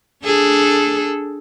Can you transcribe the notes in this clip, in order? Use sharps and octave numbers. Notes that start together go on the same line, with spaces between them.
D4 G#4 A4